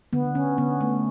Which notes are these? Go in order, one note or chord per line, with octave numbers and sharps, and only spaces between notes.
D3 B3
D3 C#4
D3 B3
A3 B3